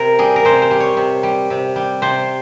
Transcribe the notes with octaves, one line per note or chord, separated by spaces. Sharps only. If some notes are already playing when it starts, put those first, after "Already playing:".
Already playing: C3 A#4
G3 G#4
A#4
C3 C5
C5
G3
C#5
C3
G3
C3
G3
C3 C5